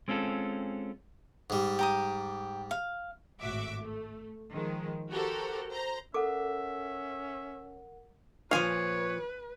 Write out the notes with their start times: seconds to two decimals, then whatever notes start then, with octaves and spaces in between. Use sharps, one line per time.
0.08 G#3 C4 C#4 F4 A4
1.50 G#2 G3
1.79 G4 A#5 D#6
2.71 F5
3.41 G#1 A2 F#4 E5 D6
3.83 A3
4.52 D#3 F3 G#3
5.11 F#4 G4 A4 A#4 C5
5.69 C5 A#5
6.14 C#4 A4 A#4 E5 F#5 D6
8.51 A#2 F3 B4 C#5 F5 G#5